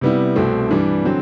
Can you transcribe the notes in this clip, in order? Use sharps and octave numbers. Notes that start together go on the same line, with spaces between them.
C3 G3 B3 E4
C2 B2 A3 C4
G2 E3 G3 D4
D3 F#3 C4